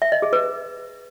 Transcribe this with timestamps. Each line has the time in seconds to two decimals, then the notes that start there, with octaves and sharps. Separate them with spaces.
0.02 E5
0.12 D#5
0.22 G#4
0.33 B4